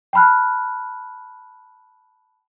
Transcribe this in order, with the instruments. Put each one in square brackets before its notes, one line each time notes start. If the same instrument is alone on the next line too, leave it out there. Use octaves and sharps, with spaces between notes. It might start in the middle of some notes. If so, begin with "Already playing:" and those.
[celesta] G5 A5 B5 F6 F#6